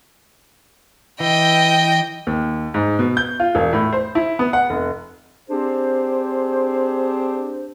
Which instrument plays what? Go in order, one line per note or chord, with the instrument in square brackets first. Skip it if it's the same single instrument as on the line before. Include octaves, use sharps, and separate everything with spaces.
[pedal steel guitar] E3 [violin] D#5 G5
[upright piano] D#2
G#2
B2
G6
F4
E1
A2
C5
E4
B3
F#5
F1
[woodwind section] C4 D4 G4 G#4 C5